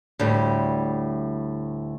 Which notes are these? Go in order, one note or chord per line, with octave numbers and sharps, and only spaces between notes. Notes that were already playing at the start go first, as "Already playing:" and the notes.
D2 A2 G3